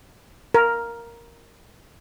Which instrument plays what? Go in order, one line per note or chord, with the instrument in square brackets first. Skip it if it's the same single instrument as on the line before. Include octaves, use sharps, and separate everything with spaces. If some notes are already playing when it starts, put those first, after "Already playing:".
[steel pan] A#4